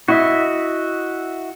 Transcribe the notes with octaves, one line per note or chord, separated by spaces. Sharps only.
E4 F#4 D#5 E5